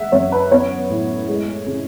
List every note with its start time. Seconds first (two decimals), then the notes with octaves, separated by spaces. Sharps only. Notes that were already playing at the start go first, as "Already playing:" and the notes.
Already playing: G#3 E5 F#5
0.12 F#2 C#5
0.32 B4
0.51 B3 C#5
0.90 A2
1.28 G#3
1.67 C#3